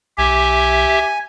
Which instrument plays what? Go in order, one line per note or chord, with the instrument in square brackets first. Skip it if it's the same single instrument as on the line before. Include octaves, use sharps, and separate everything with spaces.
[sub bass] B1 [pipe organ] G4 E5 [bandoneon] G#5